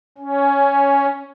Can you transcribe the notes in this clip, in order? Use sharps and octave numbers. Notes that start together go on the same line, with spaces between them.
C#4